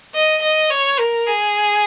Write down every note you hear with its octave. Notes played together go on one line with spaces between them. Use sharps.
D#5
D#5
C#5
A#4
G#4